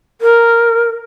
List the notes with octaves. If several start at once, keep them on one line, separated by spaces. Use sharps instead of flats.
A#4